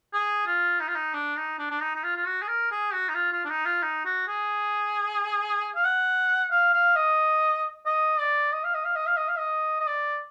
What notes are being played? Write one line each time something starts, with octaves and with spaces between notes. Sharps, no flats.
G#4
F4
D#4
F4
D#4
D4
D#4
D4
D4
D#4
D#4
F4
F4
F#4
G#4
A#4
G#4
F#4
D#4
F4
F4
D4
D#4
F4
D#4
F#4
G#4
F5
F#5
F5
F5
D#5
D#5
D5
D#5
F5
D#5
F5
D#5
F5
D#5
F5
D#5
D#5
D5